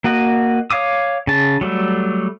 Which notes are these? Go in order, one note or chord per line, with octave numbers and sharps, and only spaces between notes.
A#3 F#4 D#5
C#5 F5 D6 D#6
C#3 A5
F#3 G3 A3